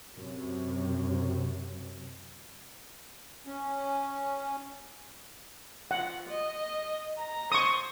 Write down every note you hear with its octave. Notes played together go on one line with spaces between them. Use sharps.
F#2 C3
C#4
F3 F#5
D#5
A#5
C5 C#6 D#6